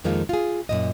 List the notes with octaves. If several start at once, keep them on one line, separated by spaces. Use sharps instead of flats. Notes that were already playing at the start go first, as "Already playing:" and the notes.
F2 D#3 G#3 A#3 F4
F4 G#4
F#2 A#2 D#5